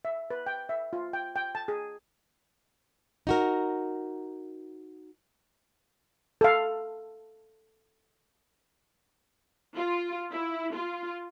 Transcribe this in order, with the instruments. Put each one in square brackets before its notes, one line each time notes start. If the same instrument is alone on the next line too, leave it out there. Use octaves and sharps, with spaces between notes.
[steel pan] E5
B4
G5
E5
F4
G5
G5
A5
G#4
[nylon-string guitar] D#4 F#4 A#4
[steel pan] A4 F5
[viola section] F4
E4
F4